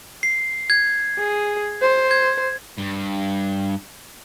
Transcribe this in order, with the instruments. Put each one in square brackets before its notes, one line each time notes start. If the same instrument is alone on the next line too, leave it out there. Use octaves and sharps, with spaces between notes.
[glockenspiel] C7
G#6
[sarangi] G#4
C5
[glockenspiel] G#6
[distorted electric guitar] G2